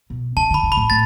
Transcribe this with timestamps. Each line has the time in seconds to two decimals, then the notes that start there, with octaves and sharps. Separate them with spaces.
0.10 B2
0.36 C#3 A5
0.50 D3 B5
0.63 C#3
0.72 A2 B5
0.90 A2 A6